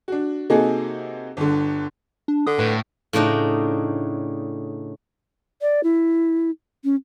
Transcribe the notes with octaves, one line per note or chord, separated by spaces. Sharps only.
D4 F#4
C3 A#3 D#4 F#4 G#4 A4
G1 D3
D4
D3 D#6
A2 B4
A2 C#3 D4 D#4
D5
E4
C#4